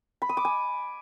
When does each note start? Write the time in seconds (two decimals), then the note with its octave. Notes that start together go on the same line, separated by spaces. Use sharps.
0.22 B5
0.29 D#6
0.37 D6
0.45 G#5